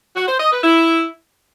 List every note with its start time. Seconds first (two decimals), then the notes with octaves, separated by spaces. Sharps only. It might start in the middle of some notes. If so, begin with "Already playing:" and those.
0.16 F#4
0.28 C5
0.40 D#5
0.51 B4
0.63 E4